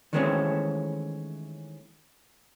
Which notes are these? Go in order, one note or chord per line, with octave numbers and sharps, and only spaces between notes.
D#3 E3 G#3 A3 C4 C#4